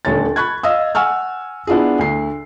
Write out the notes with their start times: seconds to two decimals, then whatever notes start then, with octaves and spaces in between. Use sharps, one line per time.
0.05 D#1 D2 C#5 A6
0.36 B5 C#6 F#6 G#6
0.63 D#5 F5 D#6 E6
0.95 F#5 G#5 C#6 E6 F6
1.67 B3 D4 E4 F4 G#4
1.99 D2 C7